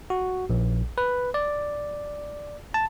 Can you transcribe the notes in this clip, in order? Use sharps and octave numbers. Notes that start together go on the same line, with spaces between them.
F#4
A#1
B4
D5
A5